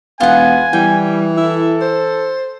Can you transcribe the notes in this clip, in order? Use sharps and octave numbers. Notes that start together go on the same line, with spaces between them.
E1 B3 F4 F#5 G#5
E3 G3 G5
E4 A4
C5